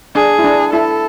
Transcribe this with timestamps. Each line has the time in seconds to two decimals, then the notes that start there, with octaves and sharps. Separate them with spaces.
0.14 D4 G#4
0.39 E4
0.44 D4
0.73 E4 A4